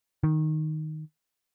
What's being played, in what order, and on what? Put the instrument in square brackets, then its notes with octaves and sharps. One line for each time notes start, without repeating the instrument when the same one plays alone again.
[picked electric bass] D#3